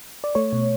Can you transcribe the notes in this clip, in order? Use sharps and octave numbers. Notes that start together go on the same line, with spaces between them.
D5
A3 C#5
B2